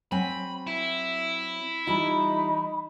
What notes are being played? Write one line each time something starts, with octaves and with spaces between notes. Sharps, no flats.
F#3 C4 G#5 B5
E4
E3 G3 D#4 F4 B5